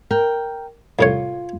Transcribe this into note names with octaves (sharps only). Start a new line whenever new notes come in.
A#4 G5
C2 A2 F4 C#5